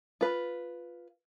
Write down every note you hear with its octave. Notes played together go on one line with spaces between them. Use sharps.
F4 B4